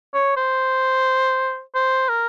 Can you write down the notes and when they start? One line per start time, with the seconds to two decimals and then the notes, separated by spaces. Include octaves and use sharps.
0.15 C#5
0.37 C5
1.75 C5
2.09 A#4